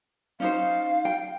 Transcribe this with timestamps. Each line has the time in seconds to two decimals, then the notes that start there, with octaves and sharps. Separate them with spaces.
0.40 C#4 D#4 C5 F5
1.05 G5